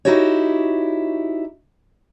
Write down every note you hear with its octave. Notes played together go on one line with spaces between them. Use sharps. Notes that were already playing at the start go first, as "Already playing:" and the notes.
D#4 E4 F#4 G4 C#5